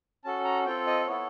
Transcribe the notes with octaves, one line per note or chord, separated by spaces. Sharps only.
C#4 F#4 A4 A5
A#5
C4 F4 A4 G5
D#5
B3 E4 A4 C#5